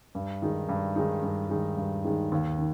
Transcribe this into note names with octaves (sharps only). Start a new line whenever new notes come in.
G2
D#3 G#3 D#4
G2
D#3 G#3 D#4
G2
D#3 G#3 D#4
G2
D#3 G#3 D#4
D#2
D#3